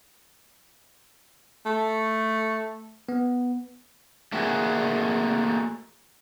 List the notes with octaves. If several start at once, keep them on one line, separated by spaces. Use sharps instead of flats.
A3
B3
A3 A#3 F#4 G#4